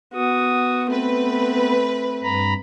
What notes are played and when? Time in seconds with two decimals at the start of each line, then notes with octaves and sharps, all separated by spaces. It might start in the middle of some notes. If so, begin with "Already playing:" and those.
0.14 B3 F#4 D#6
0.91 A3 C4 B4
2.23 G2 A#5 B5